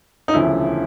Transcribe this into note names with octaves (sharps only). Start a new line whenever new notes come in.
D#4
E1 D2 C#3 F3 E4